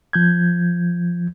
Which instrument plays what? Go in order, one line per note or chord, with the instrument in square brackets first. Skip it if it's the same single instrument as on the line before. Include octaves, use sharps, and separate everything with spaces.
[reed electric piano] F3 G6 G#6